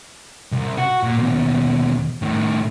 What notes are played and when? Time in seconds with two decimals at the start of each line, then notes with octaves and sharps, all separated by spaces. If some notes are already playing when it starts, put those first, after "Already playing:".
0.52 C2
0.78 F#4
1.03 A#2
1.19 D#2 B2
2.22 A2 D#3